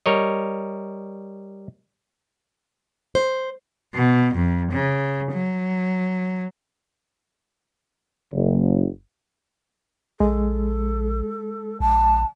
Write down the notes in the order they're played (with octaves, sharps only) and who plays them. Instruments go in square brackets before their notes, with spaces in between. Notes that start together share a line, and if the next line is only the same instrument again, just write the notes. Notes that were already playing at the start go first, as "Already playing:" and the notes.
[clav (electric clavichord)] G3 A#4 C#5 D#5
[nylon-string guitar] C5
[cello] B2
F2
C#3
F#3
[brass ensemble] F#1
[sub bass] A#1 [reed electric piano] G#3 [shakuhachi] A4
[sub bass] A#1 [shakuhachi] A5